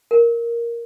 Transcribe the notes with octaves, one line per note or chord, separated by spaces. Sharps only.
A#4